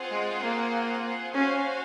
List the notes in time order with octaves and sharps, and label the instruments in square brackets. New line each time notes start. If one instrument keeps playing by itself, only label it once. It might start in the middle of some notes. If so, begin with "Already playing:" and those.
Already playing: [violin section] C4 F4 G#4 C5 F#5
[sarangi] G#3
A#3
[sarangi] C#4 [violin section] F#4 C5 F5 G#5